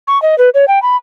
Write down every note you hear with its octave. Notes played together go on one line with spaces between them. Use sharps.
C#6
D#5
B4
C#5
G5
B5